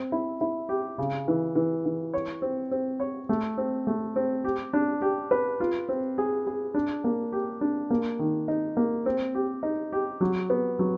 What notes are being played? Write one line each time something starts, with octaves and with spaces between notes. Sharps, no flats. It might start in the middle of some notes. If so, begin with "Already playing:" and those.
Already playing: C4
E4
E4
G4
C#3
E3
E3
E3
C#5
C4
C4
C#5
A3
C4
A3
C4
G4
D4
G4
B4
F4
C4
G#4
G#4
D4
A#3
G4
D4
A#3
D#3
D#4
A#3
C4
G4
D#4
G4
F#3
B3
F#3